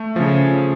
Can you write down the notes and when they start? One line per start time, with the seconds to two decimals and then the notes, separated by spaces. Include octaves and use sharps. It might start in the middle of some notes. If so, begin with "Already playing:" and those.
Already playing: A3
0.16 C#3 F3